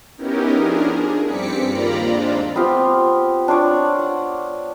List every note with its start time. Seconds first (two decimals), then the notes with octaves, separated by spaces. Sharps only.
0.17 B3 C#4 D#4 E4 G4 A#4
0.54 F3 D4 G#4 A#4
0.98 G#4
1.26 G2 G3 C4 D6 B6 C#7
1.67 D#2 A#3 F4 D5 A#5 B5
2.06 G#3 C4 D4 F4
2.56 B3 C4 F4 G4
3.48 D4 F4 C#5 D5
3.99 F#5